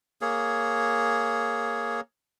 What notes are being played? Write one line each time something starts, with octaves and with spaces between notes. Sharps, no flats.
A#3 G#4 C#5